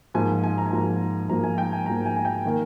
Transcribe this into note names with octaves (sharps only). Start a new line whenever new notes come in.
G#2 F3 A#3 G#5
G#5
A#5
G#5
G#2 F3 A#3 A#5
G#2 F3 A#3 A#5
G#5
G5
G#5
G#2 F3 A#3 A#5
G#5
G#5
G5
D#3 A#3